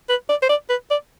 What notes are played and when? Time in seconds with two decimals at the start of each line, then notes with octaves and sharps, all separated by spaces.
0.09 B4
0.29 D5
0.42 C5
0.49 D5
0.69 B4
0.90 D5